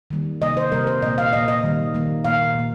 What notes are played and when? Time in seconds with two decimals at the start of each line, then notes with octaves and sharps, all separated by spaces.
0.11 D#3 G3 A#3
0.41 C3 G3 A#3 D#5
0.57 C5
0.72 C3 G3 A#3 A#4
0.87 C5
1.02 A#2 D#5
1.06 A#3
1.18 F5
1.33 A#2 A#3 D#5
1.48 D#5
1.63 D#3 G3 A#3
1.94 D#3 G3 A#3
2.24 A#2 A#3 F5
2.54 A#2 A#3